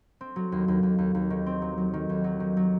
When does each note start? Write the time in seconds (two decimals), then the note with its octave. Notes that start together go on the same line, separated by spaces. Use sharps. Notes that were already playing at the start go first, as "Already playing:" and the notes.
0.21 C4
0.36 F#3
0.52 D#2
0.68 D#2
0.83 D#2
0.98 D#2
1.15 D#2
1.30 D#3
1.46 C4
1.62 F#3
1.78 F#3
1.93 D#3
2.09 D#2
2.24 F#3
2.40 D#3
2.57 F#3